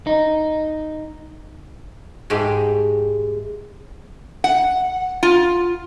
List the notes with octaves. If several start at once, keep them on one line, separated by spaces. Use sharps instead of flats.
D#4
G#2 G#3 A3 G4
F#5
F4